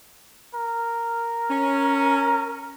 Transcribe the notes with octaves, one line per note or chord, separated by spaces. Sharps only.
A#4
C#4